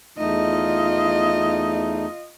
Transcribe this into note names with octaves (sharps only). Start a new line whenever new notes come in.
E2 A3 D#4 F4 D#5